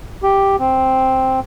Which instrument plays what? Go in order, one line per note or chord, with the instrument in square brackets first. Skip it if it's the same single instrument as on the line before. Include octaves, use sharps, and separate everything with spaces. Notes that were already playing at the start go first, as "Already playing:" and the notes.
[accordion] G4
C4